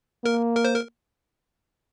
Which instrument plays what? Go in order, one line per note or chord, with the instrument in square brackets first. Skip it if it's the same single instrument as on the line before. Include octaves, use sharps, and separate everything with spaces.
[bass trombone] A#3 [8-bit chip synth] A#4
[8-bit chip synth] A#4
C5
A#4